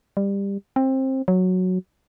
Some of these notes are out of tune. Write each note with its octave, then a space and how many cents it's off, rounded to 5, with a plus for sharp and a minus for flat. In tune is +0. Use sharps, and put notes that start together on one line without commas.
G3 +20
C4 +20
F#3 -5